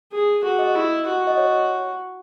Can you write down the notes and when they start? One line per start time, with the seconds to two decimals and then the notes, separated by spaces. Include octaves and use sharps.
0.12 G#4
0.43 F#4 G#4
0.59 D#5
0.75 E4
1.06 F#4
1.27 D#5
1.37 C#5